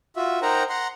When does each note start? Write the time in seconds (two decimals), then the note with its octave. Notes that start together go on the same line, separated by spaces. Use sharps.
0.16 F4 F#4 E5
0.42 D#4 A#4 C5 F#5 G5 A#5
0.69 F#5 A#5 C6